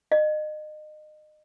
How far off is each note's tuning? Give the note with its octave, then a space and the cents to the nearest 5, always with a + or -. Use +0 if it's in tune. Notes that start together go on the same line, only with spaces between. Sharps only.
D#5 -30